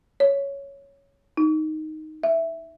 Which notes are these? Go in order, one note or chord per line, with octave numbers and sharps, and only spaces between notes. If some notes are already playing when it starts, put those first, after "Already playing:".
C#5
D#4
E5